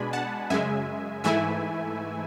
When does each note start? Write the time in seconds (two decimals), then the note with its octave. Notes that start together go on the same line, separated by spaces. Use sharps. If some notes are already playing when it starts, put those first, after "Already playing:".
Already playing: B2 G#3 D4 G#5 B5
0.13 F#5 A5
0.50 F#2 C#3 G#3 E5 G#5
1.24 G#2 E3 A3 E4 E5 G#5